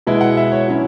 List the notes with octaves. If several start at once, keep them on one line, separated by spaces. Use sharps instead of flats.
B2 G#3 B3 E4
F#5
E5
C#5
F#3 C#4 E4